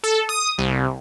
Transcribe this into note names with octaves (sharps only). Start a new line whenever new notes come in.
A4
D#6
C2